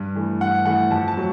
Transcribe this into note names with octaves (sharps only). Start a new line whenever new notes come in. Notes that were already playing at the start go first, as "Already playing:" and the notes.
Already playing: G2
E3 A3
G2 F#5
E3 A3 F#5
F2 A5
A5
F#3 A3